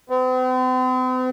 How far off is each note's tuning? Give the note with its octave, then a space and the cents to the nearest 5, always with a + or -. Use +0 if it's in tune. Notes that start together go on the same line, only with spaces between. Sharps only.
C4 -45